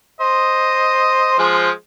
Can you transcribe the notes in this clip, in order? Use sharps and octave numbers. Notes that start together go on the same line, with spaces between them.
C5 D#5
F3 G#3 C5